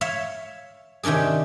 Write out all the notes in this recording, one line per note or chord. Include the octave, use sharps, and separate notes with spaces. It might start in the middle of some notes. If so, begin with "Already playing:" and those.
C#5 E5 F5
C3 D#3 C#4 D4 G#4